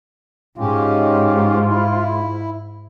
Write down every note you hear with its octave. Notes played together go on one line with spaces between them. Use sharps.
G#2 G#3 C#4 F4 G4
E4